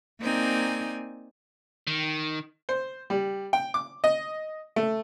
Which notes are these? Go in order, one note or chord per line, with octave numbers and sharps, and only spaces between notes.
A#3 C4 D#4 D5 G#5
D#3
C5
G3
G5
D6
D#5
A3